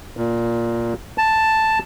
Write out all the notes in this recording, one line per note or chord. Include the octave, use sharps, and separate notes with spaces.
A#2
A5